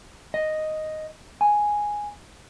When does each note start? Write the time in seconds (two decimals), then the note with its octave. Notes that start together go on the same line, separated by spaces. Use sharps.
0.34 D#5
1.41 G#5